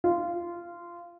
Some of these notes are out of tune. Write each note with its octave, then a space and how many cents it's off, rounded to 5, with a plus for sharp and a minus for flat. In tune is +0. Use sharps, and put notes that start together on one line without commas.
F4 -15